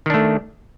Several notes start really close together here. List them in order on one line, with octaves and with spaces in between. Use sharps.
D#3 D4 A3